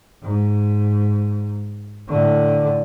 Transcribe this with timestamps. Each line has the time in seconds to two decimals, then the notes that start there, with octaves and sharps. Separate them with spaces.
0.22 G#2
2.08 A2 D3